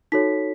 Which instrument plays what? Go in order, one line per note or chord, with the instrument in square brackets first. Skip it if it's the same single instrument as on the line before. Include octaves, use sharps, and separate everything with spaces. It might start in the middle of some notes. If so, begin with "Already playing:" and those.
[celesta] D#4 F#4 A4 C#5 B6